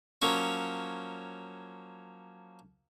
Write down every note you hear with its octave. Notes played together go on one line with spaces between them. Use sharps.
F3 F#3 A#3 C#4 C#5